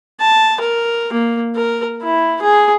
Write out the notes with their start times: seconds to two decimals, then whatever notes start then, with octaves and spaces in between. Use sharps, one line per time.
0.20 A5
0.60 A#4
1.13 A#3
1.55 A#4
2.02 E4
2.41 G#4